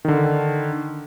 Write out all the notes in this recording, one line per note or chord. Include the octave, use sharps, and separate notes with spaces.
D3 D#3